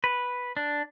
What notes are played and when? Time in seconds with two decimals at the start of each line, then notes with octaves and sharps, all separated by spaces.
0.04 B4
0.57 D4